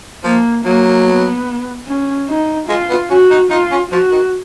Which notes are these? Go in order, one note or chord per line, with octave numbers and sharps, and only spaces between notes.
F3 A#3
F#3 A#3
B3
C#4
D#4
G#3 F4
B3
C#4 F#4
D#4
D#4 F4
C#4
F3 F#4
D#3